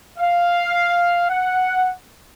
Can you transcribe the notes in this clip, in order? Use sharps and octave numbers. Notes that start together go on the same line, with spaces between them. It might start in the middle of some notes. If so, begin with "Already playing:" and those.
F5
F#5